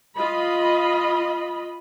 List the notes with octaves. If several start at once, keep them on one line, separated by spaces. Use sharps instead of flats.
F4 D#5 B5